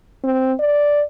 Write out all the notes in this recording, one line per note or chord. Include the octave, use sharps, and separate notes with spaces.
C4
D5